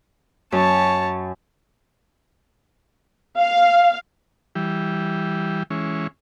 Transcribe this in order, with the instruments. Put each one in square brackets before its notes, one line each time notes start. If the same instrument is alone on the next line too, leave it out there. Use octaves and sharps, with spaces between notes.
[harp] F#2 [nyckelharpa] C#5 A5
[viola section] F5
[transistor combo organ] E3 G3
E3 G#3 C#4